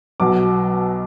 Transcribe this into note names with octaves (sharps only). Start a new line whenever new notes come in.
B1 B2 F#3 D6